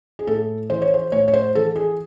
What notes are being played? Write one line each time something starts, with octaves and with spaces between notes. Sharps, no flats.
G#4
A2 A4
E3 C5
C#5
C5
A2 C#5
C#5
C5
E3 A4
G#4